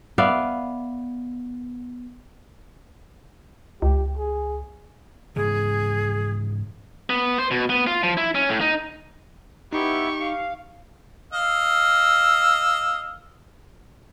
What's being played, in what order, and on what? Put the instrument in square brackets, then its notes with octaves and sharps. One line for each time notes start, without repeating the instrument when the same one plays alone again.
[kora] B3 D5 E5 F5
[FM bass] C#2 [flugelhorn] G4
[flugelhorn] G#4
[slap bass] G#2 C#3 E3 [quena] G#4
[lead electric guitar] B3
C5
B2
B3
F4
F3
E4
C#4
A2
D#4
[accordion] B3 E4 [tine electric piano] D#4 [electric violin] G4 C#6
[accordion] F5
[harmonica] D#5 F5 E6